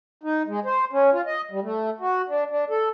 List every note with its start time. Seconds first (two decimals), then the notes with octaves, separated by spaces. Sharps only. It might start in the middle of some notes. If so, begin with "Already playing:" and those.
0.23 D#4
0.47 G#3
0.65 C5
0.93 C#4
1.13 F4
1.26 D#5
1.51 G3
1.63 A3
2.00 F#4
2.29 D4
2.50 D4
2.70 A4